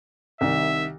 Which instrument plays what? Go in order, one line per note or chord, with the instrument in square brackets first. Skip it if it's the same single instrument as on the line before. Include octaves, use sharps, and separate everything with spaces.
[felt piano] C2 D#3 [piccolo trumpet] E5